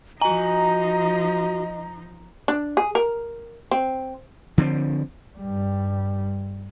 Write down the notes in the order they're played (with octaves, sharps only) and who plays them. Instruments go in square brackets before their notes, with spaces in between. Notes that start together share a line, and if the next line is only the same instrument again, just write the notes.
[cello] F3 D#4 [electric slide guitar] F#4 G#5 [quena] D#5 [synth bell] A#5
[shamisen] D4
G#4
A#4
C4
[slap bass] D3 F3 G#3 C4
[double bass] G2 G3